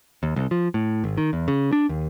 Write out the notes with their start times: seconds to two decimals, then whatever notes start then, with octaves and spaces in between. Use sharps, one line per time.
0.23 D#2
0.36 C2
0.51 F3
0.74 A2
1.04 G#1
1.18 D#3
1.33 E2
1.48 C#3
1.73 D4
1.89 D#2